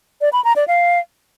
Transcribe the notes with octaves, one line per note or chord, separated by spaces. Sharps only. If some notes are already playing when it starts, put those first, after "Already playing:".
D5
B5
A#5
D5
F5